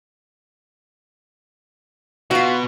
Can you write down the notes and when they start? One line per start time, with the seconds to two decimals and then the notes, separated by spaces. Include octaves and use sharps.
2.31 B2 F4 F#4